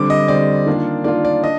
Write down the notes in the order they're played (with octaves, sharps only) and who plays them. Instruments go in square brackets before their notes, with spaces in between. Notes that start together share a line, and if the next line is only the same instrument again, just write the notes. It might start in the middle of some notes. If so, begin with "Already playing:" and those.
Already playing: [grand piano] D3 G3 C4 D6
D#5
D3 G3 C4 D5
D#3 A#3 D4 F4
D#3 A#3 D4 F4 D5
D5
D4 D#5